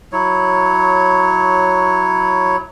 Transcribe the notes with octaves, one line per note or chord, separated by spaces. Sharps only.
F#3 E4 C#5